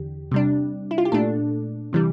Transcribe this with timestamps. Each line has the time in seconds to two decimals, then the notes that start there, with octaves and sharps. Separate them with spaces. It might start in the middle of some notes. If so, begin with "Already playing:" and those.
Already playing: E2 D3 G4
0.31 C3 G3 D4
0.91 E4
0.98 F4
1.05 G4
1.12 A#2 A3 D4 A4
1.93 C3 E3 G3